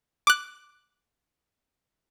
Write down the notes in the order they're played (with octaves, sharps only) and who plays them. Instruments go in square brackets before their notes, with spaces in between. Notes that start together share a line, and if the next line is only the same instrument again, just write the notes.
[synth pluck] D6 F#6